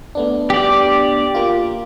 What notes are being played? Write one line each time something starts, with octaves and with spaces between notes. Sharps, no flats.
A3 B3 D4
G4 D5
A#3 F4